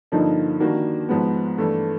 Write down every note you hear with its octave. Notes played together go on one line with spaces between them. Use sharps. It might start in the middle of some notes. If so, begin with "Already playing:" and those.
G2 D3 F3 A#3 D#4
D#3 G3 A#3 D4 F#4
G#2 F3 G#3 B3
G2 E3 A3